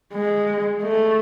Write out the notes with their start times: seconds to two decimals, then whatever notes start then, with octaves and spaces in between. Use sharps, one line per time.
0.13 G#3
0.84 A3